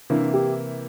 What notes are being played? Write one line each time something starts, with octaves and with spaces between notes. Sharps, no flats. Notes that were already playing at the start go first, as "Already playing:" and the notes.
C3 E3 A#3 D4 E4
G4